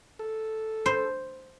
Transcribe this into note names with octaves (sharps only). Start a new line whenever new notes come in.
A4
C5